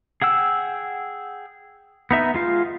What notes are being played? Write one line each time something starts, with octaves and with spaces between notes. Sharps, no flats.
G#4 F#5 G5 E6
B3 D#4 E5
G#3 F4 F5